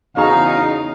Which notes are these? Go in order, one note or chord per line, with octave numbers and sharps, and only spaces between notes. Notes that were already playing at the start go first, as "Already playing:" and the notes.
E2 C#3 D#4 F#4 G#4 F5 A#5